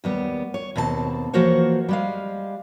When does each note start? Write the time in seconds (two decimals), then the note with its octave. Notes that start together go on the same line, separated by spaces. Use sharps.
0.04 D#2 G3 B3
0.54 C#5
0.76 D#2 B2 C4 G#4 A5
1.33 E3 F3 A#3 F#4 C5 C#5
1.89 G3 G#3 F5